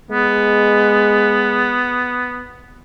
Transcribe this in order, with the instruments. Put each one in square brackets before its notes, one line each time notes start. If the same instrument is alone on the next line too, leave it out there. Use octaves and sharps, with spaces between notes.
[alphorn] G#3 [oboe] B3